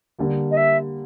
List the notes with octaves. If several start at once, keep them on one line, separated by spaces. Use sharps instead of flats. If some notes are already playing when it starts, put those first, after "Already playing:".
D3 G3 A#3
D#5
E5